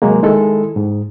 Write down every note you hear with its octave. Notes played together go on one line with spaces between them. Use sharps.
C3 F#3 G#3 A#3
D#3 G#3 E4 A4
G#2